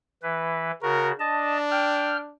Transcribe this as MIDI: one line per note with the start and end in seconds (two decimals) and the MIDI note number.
0.23 0.71 52
0.23 0.71 71
0.82 1.12 49
0.82 1.12 66
0.82 1.12 70
1.20 2.33 62
1.20 1.58 75
1.20 1.58 81
1.71 2.17 79
1.71 2.17 89